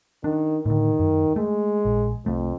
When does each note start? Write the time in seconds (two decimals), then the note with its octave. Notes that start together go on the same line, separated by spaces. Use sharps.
0.24 D#3 D4
0.66 A2 D3 D#3
1.00 F#2
1.36 G#3 A3
1.85 A#1
2.26 C2 F2 A3